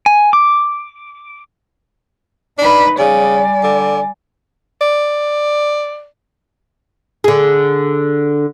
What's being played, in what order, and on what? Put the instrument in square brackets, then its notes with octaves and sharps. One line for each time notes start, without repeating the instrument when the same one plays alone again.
[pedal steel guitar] G#5
D6
[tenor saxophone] D4 [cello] D#4 B4
[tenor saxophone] C#3 [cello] G3 D5 [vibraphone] G#5
[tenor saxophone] D3
[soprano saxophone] D5
[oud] D3 G#4